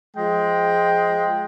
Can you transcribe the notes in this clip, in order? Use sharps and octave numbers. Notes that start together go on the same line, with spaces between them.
F3 G#3 G5